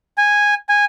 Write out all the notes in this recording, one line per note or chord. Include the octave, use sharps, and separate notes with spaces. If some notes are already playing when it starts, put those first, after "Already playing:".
G#5
G#5